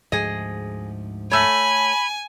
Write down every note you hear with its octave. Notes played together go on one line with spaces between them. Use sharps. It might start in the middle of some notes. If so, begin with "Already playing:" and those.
D2 G#2 F3 G#4 D#5
A3 C#5 G#5 B5